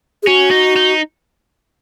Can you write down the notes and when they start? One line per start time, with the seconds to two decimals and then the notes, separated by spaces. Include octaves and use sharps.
0.23 G#4
0.27 C#4 F#4
0.51 D#4
0.76 D#4